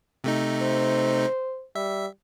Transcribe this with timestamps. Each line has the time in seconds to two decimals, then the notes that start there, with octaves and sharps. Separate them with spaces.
0.24 C3 A3 D#4
0.62 C5
1.75 G3 E5